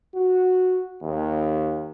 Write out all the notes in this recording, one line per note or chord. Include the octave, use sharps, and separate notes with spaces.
F#4
D#2